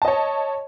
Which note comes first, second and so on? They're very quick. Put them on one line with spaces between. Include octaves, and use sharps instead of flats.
A5 D#5 C#5